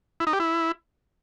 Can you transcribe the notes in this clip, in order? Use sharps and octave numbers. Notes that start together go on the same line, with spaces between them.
E4
D#4
G4
E4